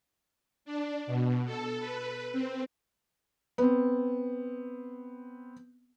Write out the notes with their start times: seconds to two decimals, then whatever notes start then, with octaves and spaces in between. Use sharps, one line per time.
0.65 D4
1.07 B2
1.46 A4
1.80 B4
2.32 C4
3.58 B3 C4